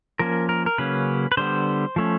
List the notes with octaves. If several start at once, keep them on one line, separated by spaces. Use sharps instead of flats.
F3 A#3 C#4 A#4
A#4
A#4
C#3 F#3 A#3 C#4 B4
B4
D3 G3 B3 C5
F3 A3 C#4